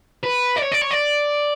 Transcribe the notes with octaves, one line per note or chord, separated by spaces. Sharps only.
B4
D5
C#5
D5
C#5
D5